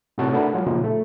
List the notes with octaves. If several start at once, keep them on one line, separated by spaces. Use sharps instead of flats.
A2 C3 D#4 F#4 C#5 A5
A3 D4 A#4 B4 F#5
F#3 G#3 F4
A#2 C#3 F3 D#4
A3